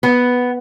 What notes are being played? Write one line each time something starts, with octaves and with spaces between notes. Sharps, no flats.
B3